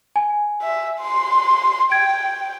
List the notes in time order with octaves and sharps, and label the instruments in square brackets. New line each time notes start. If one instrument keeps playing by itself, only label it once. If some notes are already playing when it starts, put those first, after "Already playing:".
[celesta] G#5
[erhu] E5
C6
[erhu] G5 [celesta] G#6 D7